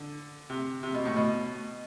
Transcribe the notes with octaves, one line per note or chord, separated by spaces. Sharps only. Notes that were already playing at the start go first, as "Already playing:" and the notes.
Already playing: D3
C3
C3
B2
A2
B2